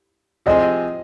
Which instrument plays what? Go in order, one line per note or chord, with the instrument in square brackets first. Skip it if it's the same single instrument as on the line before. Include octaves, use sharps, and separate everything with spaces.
[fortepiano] C3 F3 C4 G#4 [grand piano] D#5